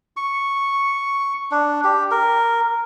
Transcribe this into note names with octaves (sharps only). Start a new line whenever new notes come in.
C#6
D4
G4
A#4